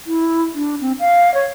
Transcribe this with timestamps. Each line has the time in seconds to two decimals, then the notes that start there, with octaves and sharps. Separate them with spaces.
0.07 E4
0.55 D4
0.81 C4
1.00 F5
1.34 C#5